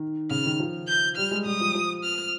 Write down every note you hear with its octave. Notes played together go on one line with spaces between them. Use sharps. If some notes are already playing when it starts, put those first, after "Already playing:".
Already playing: D#3
C#3 F6
D#3
F3
G6
G3 F6
G#3
G3 D#6
F3
F3
F6